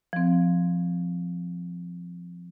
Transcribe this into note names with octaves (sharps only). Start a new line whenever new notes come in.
F3 C4